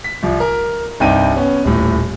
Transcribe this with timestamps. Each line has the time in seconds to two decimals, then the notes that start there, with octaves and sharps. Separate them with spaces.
0.04 B6
0.23 C2 F3
0.40 A#4
1.00 C2 G2 C4 D#4 G5 D#7
1.37 B3 C#4
1.65 D#1 A2